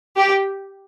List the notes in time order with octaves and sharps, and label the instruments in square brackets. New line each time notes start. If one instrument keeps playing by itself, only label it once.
[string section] G4